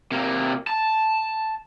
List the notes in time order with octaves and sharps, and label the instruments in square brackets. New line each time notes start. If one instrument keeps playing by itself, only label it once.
[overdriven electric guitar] C3 A#3
A5